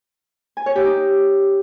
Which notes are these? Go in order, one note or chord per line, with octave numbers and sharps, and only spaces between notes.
G#5
C#5
G4
D#4